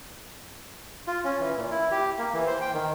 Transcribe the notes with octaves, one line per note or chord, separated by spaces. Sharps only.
F4
C#4
E3
A#2
E4
G4
A#3
E3
C5
G5
D#3